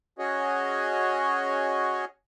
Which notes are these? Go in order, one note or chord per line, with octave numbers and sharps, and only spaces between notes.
C#4 F#4 G#4 C#5 D#5